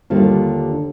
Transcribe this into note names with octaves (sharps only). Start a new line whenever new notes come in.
D#2 D3 G3 F4